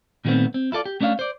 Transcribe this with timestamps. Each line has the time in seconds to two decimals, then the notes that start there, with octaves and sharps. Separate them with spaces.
0.25 A#2 D#3 G3 A3 B3 C4
0.54 C4
0.72 E4 F4 A4 D5
0.86 G4
1.01 A3 C#4 D4 C#5 F5
1.19 C5 D5